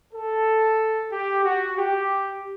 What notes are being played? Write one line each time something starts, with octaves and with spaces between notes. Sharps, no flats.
A4
G4
F#4
G4